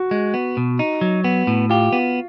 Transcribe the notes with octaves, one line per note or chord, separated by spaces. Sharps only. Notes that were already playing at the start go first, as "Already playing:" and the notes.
Already playing: F#4
G#3
B3
B2
D#4
F#3
B3
A2
F4 G4
B3